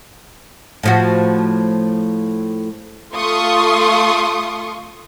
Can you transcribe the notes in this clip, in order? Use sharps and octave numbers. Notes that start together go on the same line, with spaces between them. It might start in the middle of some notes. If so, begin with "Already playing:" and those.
A2 F3 F#4
A3 F4 C6 C#6 D#6